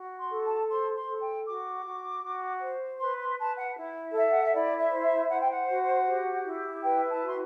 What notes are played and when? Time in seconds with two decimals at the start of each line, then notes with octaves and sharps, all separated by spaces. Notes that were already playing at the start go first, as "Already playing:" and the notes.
Already playing: F#4
0.19 C6
0.30 A4
0.44 A5
0.69 C5 C6
0.94 C6
1.08 A4
1.20 G5
1.46 F#4 D6
1.84 F#4
2.22 F#4
2.60 C5
2.99 B4 C6
3.19 C6
3.38 B4 A5
3.56 F#5
3.75 E4
4.13 A4 E5
4.31 F#5
4.42 E5
4.53 E4 D5
4.77 E5
4.90 C5
5.03 E5
5.29 C5 F#5
5.41 G5
5.51 F#5
5.68 F#4
6.05 G4
6.45 E4
6.82 B4 G5
7.08 A5
7.21 F#4 C6